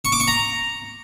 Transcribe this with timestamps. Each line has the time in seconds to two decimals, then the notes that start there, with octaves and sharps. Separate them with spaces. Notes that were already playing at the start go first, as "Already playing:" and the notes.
0.05 C#6
0.12 D6
0.20 C#6
0.28 A#5